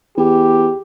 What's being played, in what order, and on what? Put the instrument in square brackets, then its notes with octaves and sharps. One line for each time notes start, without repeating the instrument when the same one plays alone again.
[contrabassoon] E2 [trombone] G4